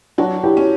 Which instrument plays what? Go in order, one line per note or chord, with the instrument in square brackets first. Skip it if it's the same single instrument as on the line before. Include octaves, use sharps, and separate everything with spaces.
[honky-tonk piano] F#3 [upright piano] D4 F#4
[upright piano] E4 G4
[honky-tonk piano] C#4